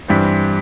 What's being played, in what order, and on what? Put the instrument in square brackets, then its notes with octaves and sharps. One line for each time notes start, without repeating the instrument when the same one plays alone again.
[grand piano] G2 E3 G3 C4